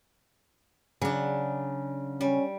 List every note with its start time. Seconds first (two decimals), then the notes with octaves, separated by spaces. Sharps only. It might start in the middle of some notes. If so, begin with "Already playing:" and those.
1.01 C#3 F#3 D4
2.21 G3 C#4